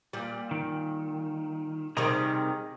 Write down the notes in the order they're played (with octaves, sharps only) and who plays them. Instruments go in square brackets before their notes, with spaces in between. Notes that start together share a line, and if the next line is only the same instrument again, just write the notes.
[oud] A#2 G3
[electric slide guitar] D#3
[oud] C3 D#3 G3 [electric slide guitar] G#4 D#5 A#5